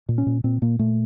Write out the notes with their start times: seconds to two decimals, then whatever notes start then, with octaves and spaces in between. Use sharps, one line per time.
0.09 A#2
0.18 C#4
0.26 A#2
0.44 A#2 C4
0.62 A#2 A#3
0.79 A#2 A3